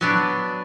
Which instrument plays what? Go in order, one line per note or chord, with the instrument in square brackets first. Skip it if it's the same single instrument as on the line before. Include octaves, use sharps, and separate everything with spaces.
[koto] F#3 B3 D4